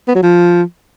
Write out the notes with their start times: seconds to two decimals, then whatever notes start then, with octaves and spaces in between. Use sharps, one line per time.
0.08 B3
0.15 F#3
0.23 F3